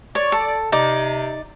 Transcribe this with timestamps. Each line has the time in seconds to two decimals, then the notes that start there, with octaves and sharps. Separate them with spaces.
0.15 C#5 D5
0.32 A4
0.72 C3 D#4 D5